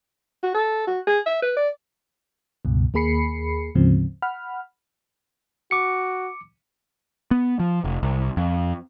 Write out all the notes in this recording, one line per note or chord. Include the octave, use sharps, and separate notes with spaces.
F#4
A4
F#4
G#4
E5
B4
D5
C#2 G2 B2
D#2 A#3 G#4 B5 C7 C#7
D2 G#2 C#3 F3 C4
F#5 B5 F6
F#4 D6 C#7
B3
F3
F1
C2
F2